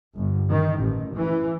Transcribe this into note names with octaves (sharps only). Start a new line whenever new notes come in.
G1
D#3
A1
E3